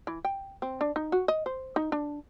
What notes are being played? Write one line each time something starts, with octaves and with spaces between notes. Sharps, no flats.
E3
G5
C4
D4
D#4
F#4
D#5
C5
D#4
D4